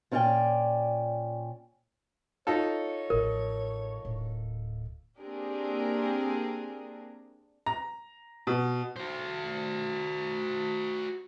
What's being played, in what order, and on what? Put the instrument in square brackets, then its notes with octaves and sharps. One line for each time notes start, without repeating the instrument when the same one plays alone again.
[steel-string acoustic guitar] A#2 C#4 D4 G4 D5 G5
[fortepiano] D#4 F4 A4 [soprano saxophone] C#5
[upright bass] A1 F3 [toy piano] A#4
[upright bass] D1
[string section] A#3 C4 D4 G4 G#4 A#4
[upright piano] A#5
B2
[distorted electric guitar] F#4 C5